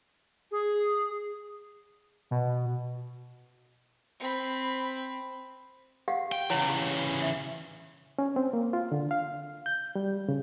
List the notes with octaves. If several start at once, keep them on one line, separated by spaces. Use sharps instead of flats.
G#4
B2
C4 B5
G4 F5 F#5
G5
C#3 E3 E4 C#5 F#5
G4
E5
C#4
C4
A#3
F4
D3
F5
G6
G3
C#3